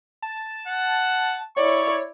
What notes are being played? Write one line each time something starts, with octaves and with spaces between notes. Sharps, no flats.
A5
F#5
E4 C#5 D5 C#6